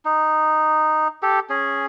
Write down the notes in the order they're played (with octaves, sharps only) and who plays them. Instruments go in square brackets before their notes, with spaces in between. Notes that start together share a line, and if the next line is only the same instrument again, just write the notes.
[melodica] D#4
G4 A4
C#4 G#4